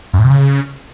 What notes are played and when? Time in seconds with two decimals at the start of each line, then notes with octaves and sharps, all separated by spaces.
0.14 F#2
0.19 A2
0.24 C3
0.30 C#3